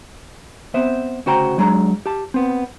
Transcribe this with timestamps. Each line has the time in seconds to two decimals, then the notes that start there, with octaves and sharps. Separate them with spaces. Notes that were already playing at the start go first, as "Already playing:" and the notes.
0.74 B3 C4 C5 E5
1.26 D2 C#3 F#4 C5 G5 A#5
1.58 F#3 G#3 D4 A#5
2.06 G4 A5
2.34 B3 C4